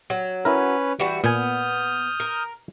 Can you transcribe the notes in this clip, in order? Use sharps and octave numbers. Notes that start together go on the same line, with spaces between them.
F#3
C#4 E4 A#4 B4
E3 G3 F#4
A#2 B3 G#5 D#6 F6 G6
A#4